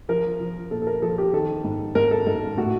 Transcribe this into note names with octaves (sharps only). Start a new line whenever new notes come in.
F3 A#4
F3
A#2 A4
A4
A#4
F3 A4
G4
D#3 A4
G#2
G#2 A#4
A4
G#2 A4
A2 F#4